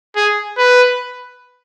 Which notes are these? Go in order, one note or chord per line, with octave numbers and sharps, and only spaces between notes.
G#4
B4